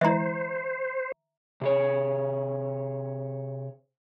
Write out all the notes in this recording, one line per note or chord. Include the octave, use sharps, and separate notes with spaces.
E3 G#3 E4 C5 E5 A#5
C3 G#4 C#5